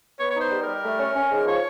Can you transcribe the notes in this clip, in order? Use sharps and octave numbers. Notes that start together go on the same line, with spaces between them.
B3 C#5
C#5
D#4 C5
G3
A#4
G3
A3
C#4
C#4
G#2
F3 C#5